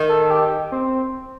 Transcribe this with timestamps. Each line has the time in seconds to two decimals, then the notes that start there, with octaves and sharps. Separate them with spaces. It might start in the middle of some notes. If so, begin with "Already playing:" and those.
Already playing: D#3
0.09 A4
0.30 G4
0.72 C4